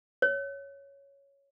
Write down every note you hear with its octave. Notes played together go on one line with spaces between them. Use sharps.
C#5